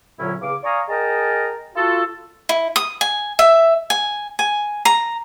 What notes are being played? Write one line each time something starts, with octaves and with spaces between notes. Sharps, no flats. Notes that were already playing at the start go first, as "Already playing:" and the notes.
C2 A#2 D3 F#3 C#4 E4
E2 C#3 F5 D6
D5 F5 G#5 A#5 C#6 D#6
G#4 A#4 D#5 G5 A5 A#5
F4 F#4 A4
E4
D#6
G#5
E5
G#5
G#5
A#5